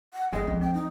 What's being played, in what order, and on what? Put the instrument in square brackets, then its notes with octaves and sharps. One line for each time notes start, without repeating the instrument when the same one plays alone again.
[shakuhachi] F#5
[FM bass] G1 [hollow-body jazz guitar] E2 G#3 [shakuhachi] D#5
[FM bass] B1 [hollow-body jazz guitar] F2
[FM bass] C4 [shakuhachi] G5
[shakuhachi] D#4